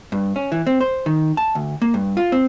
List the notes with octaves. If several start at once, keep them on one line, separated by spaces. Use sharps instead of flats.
G2
C#4
E3
C4
C5
D#3
A5
D2
A#3
G2
F4
C4